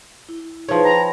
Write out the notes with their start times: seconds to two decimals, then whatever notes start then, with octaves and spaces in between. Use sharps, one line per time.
0.29 E4
0.69 F3 D#4 G#4 B4 C#5
0.84 G5 A#5 B5